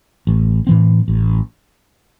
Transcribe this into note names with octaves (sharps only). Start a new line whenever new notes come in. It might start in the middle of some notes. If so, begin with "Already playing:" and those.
A1
A2 E3 C4
A1